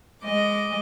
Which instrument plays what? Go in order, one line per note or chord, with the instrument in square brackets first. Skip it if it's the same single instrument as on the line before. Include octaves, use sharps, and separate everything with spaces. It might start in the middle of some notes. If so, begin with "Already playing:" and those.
[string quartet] G#3 D#5 D6